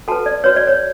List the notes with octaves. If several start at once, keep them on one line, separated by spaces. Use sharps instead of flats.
F#4 A4 B4 A5
D5
F#4 B4 C#5
D5
C#5